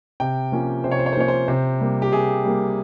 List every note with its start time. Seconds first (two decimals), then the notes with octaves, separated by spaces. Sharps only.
0.20 C3 G5
0.52 F3 A#3 C#4
0.84 C3 C5
0.91 C#5
0.99 C5
1.06 C#5
1.13 C5
1.16 F3 A#3 C#4 C#5
1.28 C5
1.48 C3 C5
1.80 G3 A#3
2.02 G4
2.12 C3 G#4
2.45 G3 A#3